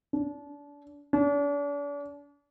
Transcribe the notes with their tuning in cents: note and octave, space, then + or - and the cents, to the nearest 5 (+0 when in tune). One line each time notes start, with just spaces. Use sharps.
D4 -30
D4 -40